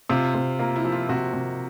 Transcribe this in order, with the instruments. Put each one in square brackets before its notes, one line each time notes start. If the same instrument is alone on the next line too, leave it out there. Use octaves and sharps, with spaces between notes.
[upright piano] C3 [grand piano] F4
[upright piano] C3
[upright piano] A#3 [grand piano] F4
[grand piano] E4
[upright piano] F3
[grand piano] F4
[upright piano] C3 [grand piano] F#4
[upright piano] C3